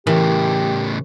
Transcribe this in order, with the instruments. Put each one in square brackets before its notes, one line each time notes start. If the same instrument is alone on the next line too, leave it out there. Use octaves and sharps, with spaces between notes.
[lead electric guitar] A2 C#3 [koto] E3 [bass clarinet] G4 [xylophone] A#4